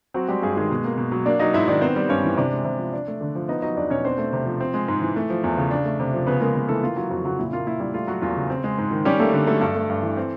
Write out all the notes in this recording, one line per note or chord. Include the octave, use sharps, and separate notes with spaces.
F#3 C4 F#4
G3 G#3 G4
G2 G#3 G#4
D#3 G#3 G#4
B2
A#3
B2
F#3
A#3 D4 D5
F#3 D#4 D#5
G#2 E4 E5
D#3 D4 D5
B3 C4 C5
G3
G2 C#4 C#5
E3
C3 D4 D5
G#3
C3
F3
D4
A3
D3
F3
B3 D#4 D#5
F#3 D#4 D#5
E2 D4 D5
B2 C#4 C#5
C4 D4 C5
A3
C3
F3
C4
G#3
G#2
E3
A3
F3
E2
C#3
D4
A3
C3
F3
C#3 B3 B4
G#3 A#3 A#4
C#3
E3 A3 A4
A#3 F4
F#3 F4
F2 F#3 F#4
C#3 F#3 F#4
A#2 E4
A#3 F4
A#2 E4
G3 E4
A3 F4
F#3 F#4
E2 F4
C#3
C4
G#3
G#2
D#3
G3 C#4 G4
A3 A#3 A4
D3
F#3 A3 A4
G2 A3 A4
A3
G2
E3
C4